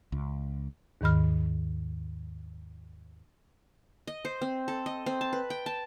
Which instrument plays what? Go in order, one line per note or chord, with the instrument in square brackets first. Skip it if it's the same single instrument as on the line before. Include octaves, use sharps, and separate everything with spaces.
[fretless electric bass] C#2
[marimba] D#2 G#2 D#3 B5 F6
[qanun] D#5
C5
C4
A4
D#5
C4
A5
B4
G5
A5